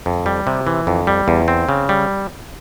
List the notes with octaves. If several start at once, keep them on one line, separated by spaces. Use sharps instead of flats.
F2
G3
C3
E3
F2
G3
E2
C4
C#3
G3